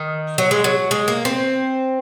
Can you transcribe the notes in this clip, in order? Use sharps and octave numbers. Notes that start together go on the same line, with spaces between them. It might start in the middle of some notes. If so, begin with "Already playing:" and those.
Already playing: D#3
F#3
G#3
F#3
G#3
A#3
C4